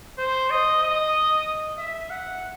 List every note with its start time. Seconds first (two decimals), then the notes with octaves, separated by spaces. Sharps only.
0.18 C5
0.50 D#5
0.83 D#5
1.78 E5
2.10 F#5